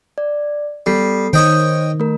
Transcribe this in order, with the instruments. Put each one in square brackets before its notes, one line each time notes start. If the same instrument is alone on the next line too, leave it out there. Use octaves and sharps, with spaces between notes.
[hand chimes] D5
[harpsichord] G3 [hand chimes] B3 A4 C7
[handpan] D#3 [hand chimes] C5 [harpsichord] C#5 D#5 G5
[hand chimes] A3 A#4